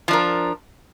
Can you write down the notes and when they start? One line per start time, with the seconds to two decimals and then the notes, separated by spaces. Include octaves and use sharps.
0.08 F3
0.11 D4
0.13 A#4